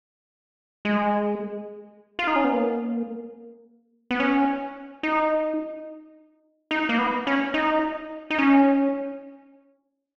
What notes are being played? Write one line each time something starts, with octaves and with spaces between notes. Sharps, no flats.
G#3
F4
D#4
C#4
B3
A#3
B3
C#4
D#4
D#4
A#3
B3
C#4
D#4
D#4
C#4